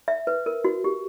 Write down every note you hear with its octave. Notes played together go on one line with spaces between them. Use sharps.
E5
B4
A#4
F#4
G4